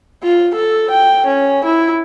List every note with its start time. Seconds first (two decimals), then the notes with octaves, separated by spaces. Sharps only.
0.23 F4
0.55 A4
0.91 G5
1.26 C#4
1.65 E4